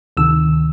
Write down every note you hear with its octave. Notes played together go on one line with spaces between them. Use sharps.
D2 C3 D#3 E6